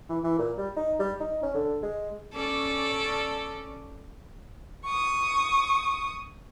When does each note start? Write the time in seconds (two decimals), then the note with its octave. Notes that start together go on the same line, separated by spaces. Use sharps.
0.09 E3
0.23 E3
0.38 A#2
0.58 G3
0.76 D#4
0.99 G3
1.20 D#4
1.43 C#4
1.54 D3
1.83 G#3
2.35 C#4 A4 D5
4.85 C#6 D#6